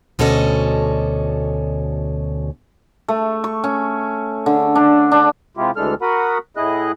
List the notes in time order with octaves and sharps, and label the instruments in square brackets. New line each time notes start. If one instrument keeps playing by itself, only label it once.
[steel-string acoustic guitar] D2 B2 C#4 A4 D5 D#5
[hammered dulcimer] A3
C#6
C#4
D3
D4
D4
[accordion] C3 G#3 E4 F4 G4
D2 E3 G#3 D4 A4 F6
F#4 A#4 F#5 B5 D#6
A2 E4 G#4 D#5 F#6